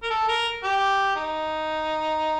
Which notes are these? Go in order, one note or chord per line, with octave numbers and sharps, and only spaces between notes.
A#4
A4
A#4
G4
D#4